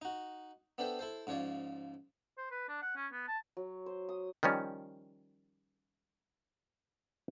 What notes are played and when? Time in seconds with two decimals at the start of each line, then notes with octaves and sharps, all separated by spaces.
0.02 D#4 F#4
0.78 B3 D4 A4 C5 E5 G5
0.99 E4 A4 C5
1.27 G#2 C#3 F3 C#5 D5
2.38 C5
2.51 B4
2.69 D4
2.82 F#5
2.96 C#4
3.12 B3
3.28 A5
3.57 F#3
3.86 C5
4.09 D#6
4.43 D#3 F3 G3 C#4